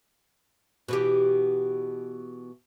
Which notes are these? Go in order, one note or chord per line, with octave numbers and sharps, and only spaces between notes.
B2 E3 G4